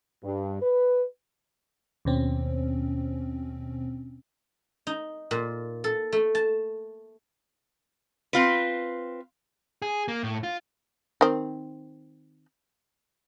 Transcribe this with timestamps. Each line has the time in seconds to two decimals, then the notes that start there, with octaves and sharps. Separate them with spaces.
0.23 G2
0.62 B4
2.05 D#2 B2 C4 C#4
4.87 D#4
5.31 A#2
5.84 A4
6.12 A3
6.35 A5
8.33 C4 F4 B4
9.82 G#4
10.08 A#3
10.23 A2
10.43 F4
11.21 D#3 C4